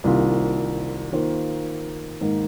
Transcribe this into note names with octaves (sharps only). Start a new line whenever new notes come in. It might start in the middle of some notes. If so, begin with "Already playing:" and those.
C2 C3 D#3 A#3 F4
D#3 A#3 F4 C5
G#2 D#3 A#3 D#4